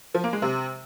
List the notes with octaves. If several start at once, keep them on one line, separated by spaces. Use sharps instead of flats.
F3
A#3
G#3
C3